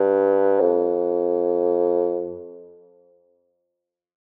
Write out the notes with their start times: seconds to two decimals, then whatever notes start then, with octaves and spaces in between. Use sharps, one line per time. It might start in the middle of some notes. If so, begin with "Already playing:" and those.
Already playing: G2
0.60 F2